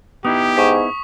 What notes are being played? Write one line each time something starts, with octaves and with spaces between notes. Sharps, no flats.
B3 D#4 E4 G4 D#6
G#2 C#6 B6